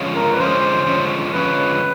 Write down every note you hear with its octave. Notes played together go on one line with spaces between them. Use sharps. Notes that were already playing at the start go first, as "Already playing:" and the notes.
Already playing: D3 F3 G#3 C#4
A#4
B4
D3 F3 G#3 C#4 C5
D3 F3 G#3 C#4
D3 F3 G#3 C#4 B4